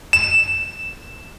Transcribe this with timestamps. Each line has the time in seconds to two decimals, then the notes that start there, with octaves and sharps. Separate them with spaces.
0.13 E7